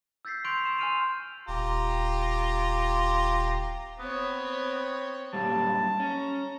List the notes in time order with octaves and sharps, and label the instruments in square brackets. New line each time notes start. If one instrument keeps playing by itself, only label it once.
[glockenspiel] E6 G6 A6 B6 C7
C6 C#6 F#6 G6 D7 F7
E6 C7 E7
G#5 C6 F6 D7 D#7 F7
[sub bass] D#1 [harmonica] F4 G4 A#5
[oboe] B3 [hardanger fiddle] C4 C#5
[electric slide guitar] F#2 A#2 G3 [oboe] A5
[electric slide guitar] C#4 [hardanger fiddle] A#5